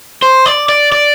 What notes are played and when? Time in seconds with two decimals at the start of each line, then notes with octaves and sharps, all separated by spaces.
0.22 C5
0.46 D5
0.69 D5
0.92 D5